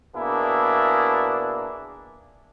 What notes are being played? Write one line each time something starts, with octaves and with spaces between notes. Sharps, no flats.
B2 A#3 D4 E4 G#4